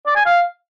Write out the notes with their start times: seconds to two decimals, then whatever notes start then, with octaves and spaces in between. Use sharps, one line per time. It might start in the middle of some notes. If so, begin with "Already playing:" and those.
0.06 D5
0.16 G#5
0.26 F5